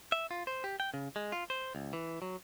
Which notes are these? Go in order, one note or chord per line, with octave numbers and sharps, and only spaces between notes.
E5
F4
C5
G4
G5
C#3
G#3
F4
C5
C#2
E3
F#3